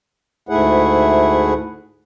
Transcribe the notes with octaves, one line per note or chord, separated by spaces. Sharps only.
D2 G#2 A3 E4 G#4 F#5